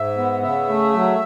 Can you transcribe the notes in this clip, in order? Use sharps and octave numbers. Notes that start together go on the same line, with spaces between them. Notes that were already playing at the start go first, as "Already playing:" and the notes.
Already playing: G#2 E5
B3
C#3 E5
A3
F#3